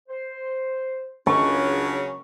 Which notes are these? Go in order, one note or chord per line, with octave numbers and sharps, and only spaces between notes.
C5
C#2 C#3 F#3 C#4 D4 C#6